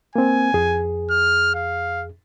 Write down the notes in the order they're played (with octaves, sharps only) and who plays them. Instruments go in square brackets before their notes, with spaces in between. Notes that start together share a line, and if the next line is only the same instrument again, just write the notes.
[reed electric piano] A#3 C4 [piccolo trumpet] G#5
[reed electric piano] F2 G#4
[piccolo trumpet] F6
F5